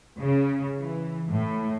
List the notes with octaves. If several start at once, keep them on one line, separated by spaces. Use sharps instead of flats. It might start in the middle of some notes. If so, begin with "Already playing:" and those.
C#3
E3
A2